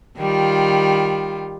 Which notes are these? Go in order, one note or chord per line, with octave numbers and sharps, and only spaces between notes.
D#3 G3 F4